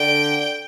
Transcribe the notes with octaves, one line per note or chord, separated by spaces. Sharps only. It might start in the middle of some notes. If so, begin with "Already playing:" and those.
Already playing: D3 G5